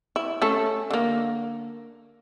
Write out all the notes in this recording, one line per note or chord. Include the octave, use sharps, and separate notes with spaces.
E4
A3 C#4 A4
D3 A#3